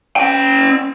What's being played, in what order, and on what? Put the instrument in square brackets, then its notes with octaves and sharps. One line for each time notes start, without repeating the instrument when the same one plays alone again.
[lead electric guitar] C#4 G5